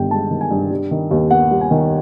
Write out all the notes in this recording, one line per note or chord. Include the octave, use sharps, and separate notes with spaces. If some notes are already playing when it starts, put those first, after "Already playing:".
Already playing: G1 G2 D#3 G5
G#3 A5
D#3
G#5
G2
G3
D#3
D#2
B3 F#5
G3
G#5
D#3